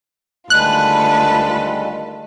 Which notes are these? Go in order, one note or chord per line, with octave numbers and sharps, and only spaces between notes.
D2 D#3 G3 G#3 F4 A4 B4 F#6